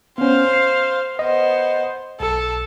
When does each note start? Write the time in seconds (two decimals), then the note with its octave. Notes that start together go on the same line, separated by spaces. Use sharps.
0.18 B3 C#4 C5 F5
0.53 C7
1.19 B3 C5 D#5
2.20 B1 A4